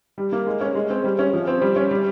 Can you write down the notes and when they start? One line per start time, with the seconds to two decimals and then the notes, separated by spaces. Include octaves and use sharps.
0.18 G3
0.32 A#3
0.47 G#3
0.61 C#4
0.75 G#3
0.90 C4
1.04 G3
1.19 C#4
1.33 F3
1.47 C4
1.62 G3
1.76 C#4
1.91 G3